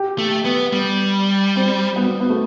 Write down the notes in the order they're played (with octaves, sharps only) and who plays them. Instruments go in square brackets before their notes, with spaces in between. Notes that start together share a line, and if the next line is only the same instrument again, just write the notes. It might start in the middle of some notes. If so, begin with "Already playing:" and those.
Already playing: [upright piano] G4
[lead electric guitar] A3
B3
G3
[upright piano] C4
B3
B3
A3